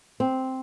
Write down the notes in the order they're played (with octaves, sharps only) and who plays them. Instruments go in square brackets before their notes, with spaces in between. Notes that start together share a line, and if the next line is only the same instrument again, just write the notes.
[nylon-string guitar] C4